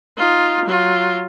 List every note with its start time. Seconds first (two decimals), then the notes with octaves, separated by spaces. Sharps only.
0.17 D#4 F4
0.65 F#3 F4